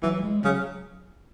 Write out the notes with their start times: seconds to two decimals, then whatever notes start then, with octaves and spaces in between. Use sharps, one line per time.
0.03 E3 F#3
0.23 G#3
0.44 C#3 F#3